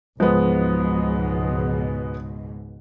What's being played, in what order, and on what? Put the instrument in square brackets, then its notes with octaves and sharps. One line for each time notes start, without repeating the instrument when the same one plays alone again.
[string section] C#2 G#2 B2 [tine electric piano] F3 [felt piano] G#3 B3